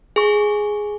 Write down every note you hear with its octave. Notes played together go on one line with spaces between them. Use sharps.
G#4 C#6